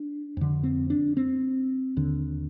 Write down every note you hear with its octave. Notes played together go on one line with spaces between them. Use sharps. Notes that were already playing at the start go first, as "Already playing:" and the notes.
Already playing: D4
F2 D3
C4
D4
C4
D#2 D3